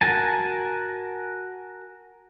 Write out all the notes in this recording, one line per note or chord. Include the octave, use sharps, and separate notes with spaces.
F#4 A#4 G#5 A5